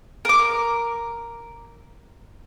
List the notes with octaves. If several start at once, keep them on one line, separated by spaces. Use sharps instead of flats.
A#4 D6